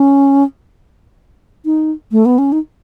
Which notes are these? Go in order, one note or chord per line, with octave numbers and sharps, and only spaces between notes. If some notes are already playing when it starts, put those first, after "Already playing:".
Already playing: C#4
D#4
A3
B3
C#4
D#4